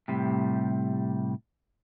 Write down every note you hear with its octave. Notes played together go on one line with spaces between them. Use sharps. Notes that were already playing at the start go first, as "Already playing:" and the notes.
A2 C3 G3